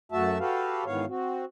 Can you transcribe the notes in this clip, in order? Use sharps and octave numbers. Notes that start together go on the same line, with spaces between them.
F#2 A3 F#4 E5 A5
F#4 G4 A4 B4 F5
G#2 D#3 E3 B3 C#5 F5
C4 F#4